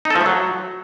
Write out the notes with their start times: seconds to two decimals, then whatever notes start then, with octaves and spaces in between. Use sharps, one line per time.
0.05 D#4
0.10 A4
0.16 F3
0.21 A3
0.26 F#3